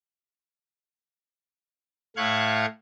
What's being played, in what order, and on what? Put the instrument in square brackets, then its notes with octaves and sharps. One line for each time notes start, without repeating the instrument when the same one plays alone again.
[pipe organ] A2 A3 F5 C#6 F#6 G#6